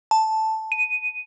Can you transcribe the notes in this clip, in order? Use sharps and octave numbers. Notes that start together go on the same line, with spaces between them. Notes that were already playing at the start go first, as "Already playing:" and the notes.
A5
D#7